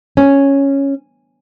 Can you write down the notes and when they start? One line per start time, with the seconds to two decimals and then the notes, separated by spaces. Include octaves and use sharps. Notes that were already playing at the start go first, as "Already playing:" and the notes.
0.17 C#4